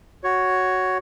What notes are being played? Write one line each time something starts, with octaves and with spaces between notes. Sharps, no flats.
F#4 C#5